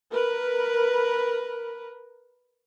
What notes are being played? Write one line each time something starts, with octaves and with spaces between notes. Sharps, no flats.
A#4 B4